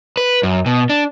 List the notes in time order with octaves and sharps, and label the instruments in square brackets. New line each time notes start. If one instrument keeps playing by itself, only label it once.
[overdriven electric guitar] B4
F#2
B2
D4